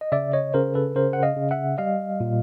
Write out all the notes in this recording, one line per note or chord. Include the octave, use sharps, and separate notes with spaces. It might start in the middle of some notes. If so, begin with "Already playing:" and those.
D#5
C#3 D5 E5
C#5 D#5
C#3 A#4 C5
A4 B4
C#3 A#4 C5
F#5
D#5 F5
C#3
E5 F#5
G3 D#5 F5
A#2